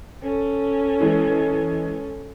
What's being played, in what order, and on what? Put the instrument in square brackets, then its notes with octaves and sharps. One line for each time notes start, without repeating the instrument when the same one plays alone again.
[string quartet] C#4 A4
[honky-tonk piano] E3 G#3